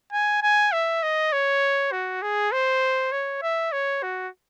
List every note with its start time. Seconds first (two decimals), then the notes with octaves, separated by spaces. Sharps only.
0.13 G#5
0.43 G#5
0.72 E5
1.03 D#5
1.33 C#5
1.92 F#4
2.22 G#4
2.52 C5
3.12 C#5
3.42 E5
3.72 C#5
4.03 F#4